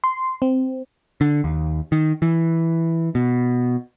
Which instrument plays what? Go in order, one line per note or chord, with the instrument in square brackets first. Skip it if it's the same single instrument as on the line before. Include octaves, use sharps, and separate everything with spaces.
[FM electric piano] C6
C4
[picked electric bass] D3
D#2
D#3
E3
B2